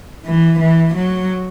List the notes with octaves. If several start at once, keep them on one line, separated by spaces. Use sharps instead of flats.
E3
E3
F#3